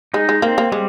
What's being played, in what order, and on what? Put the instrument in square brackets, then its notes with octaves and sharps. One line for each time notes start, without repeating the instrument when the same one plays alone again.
[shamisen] G#3 [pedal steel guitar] D#4
[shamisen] G#3
[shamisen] A#3 [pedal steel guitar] C4
[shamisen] A#3
[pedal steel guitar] G3 [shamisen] G#3